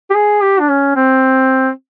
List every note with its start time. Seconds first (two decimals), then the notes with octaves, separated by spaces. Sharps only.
0.10 G4
0.15 G#4
0.42 G4
0.60 D4
0.70 C#4
0.96 C4